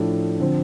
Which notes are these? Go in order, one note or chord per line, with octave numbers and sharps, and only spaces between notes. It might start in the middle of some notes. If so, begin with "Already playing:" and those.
Already playing: A2 F3 D4 A4
D3 F3 C4